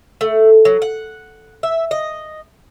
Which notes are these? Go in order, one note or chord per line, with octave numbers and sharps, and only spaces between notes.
A3
F#3
F#5
E5
D#5